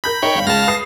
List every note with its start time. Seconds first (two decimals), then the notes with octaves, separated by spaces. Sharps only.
0.04 A#4 B5 G6 A#6
0.22 D#4 A#4 C#5 G5
0.35 G1 F5
0.47 C#2 F5 A5 A#6
0.68 B4 D#6 C7